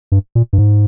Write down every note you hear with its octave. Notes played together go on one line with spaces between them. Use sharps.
G2
A#2
G2
G#2